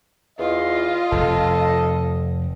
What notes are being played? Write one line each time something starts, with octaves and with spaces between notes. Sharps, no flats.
E2 F4 D#5
F1 A4